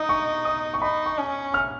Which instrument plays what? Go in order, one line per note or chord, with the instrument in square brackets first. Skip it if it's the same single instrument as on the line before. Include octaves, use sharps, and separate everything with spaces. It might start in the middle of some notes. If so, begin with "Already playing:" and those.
Already playing: [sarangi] D#4 [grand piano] D#6
[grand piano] C#6
D#6
C#6
[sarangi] D#4 [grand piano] B5
[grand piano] C#6
[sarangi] C#4
[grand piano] F6